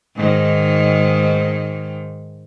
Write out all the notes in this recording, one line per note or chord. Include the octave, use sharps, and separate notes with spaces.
G#2 D#3